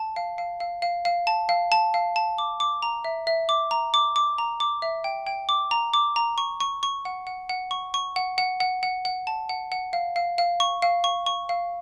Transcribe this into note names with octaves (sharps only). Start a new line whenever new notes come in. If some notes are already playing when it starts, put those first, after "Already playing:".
Already playing: A5
F5
F5
F5
F5
F5
A5
F5
A5
F5
A5
D6
D6
A#5
E5
E5
D6
A#5
D6
D6
A#5
D6
E5
G5
G5
D6
A#5
D6
A#5
C#6
C#6
C#6
F#5
F#5
F#5
C#6
C#6
F#5
F#5
F#5
F#5
F#5
A5
F#5
F#5
F5
F5
F5
C#6
F5
C#6
C#6
F5